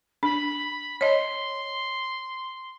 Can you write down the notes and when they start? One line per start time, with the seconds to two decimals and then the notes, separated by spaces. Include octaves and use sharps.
0.23 D4 B5
1.01 C#5 D#5 C6